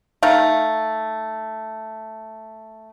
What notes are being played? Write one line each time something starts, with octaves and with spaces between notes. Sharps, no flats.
A3 D#4 F5